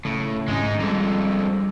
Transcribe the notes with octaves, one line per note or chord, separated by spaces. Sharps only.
A2 C#3
G#1 G#3 C#4 D#4
F2 D3 G3 G#3